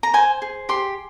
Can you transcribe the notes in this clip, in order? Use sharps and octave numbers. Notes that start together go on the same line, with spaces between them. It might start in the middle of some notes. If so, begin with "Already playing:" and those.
A#5
C5 G#5
G#4
G4 C6